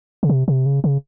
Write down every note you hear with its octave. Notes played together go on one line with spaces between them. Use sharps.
C#3
C3
C3
C#3
C#3